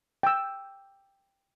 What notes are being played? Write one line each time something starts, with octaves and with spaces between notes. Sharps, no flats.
G5 E6